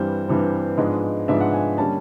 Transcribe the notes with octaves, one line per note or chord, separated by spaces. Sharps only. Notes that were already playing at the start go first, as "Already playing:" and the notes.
Already playing: G2 E3 G3 C4 C5
G2 E3 G3 C4
G#2 F3 G#3 B3 D4
G#2 F3 G#3 B3 D4 E5
F#5
G#5
D3 G3 A#3 C#4 A5